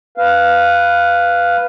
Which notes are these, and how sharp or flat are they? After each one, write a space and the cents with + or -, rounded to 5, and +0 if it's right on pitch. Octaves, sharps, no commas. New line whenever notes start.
B4 +0 F5 +0